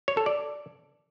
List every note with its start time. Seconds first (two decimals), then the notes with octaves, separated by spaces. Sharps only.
0.08 C#5
0.17 A4
0.26 D5